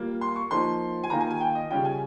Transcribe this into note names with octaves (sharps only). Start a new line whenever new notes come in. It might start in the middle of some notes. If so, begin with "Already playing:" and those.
Already playing: G3 A#3 F4
C6
C#6
F3 A#3 D#4 C6
G#5
D#3 A#3 F4 A#5
G#5
G#5
G5
D#5
C#3 G3 C#4 F4 G5
G#5